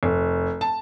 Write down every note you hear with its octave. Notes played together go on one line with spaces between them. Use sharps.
F1
A5